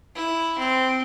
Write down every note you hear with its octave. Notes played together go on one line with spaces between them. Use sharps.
E4
C4